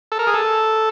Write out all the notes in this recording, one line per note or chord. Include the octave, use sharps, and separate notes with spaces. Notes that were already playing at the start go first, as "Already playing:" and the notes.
A4
A#4
G#4
A4